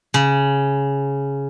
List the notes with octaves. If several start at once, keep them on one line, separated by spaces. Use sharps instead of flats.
C#3